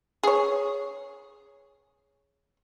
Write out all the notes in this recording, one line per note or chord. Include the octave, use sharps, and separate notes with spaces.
G#4 C#5